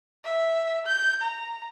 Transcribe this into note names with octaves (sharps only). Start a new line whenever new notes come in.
E5
G6
A#5